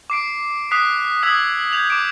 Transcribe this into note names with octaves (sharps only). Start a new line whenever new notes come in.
D6 C7 D7
D#6 F#6 B6 C7
D#6 E6 G#6 B6 F#7
G6 G#6 F7 F#7
D6 D7